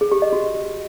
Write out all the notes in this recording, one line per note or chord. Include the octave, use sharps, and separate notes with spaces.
G#4
G4
D#5
F#4